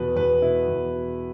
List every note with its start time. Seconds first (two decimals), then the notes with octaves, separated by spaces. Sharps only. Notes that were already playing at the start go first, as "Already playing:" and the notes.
Already playing: E2 B2 B4
0.16 E2 B4
0.41 B2 E4
0.68 E2
0.93 B2